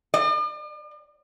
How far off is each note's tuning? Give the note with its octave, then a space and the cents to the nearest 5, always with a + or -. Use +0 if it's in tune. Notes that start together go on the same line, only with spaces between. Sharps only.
D5 +45